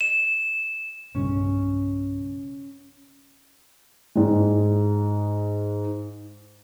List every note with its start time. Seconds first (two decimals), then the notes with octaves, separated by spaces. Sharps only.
0.01 E7
1.15 B1 G2 C#3 C#4
4.15 G#2 G#3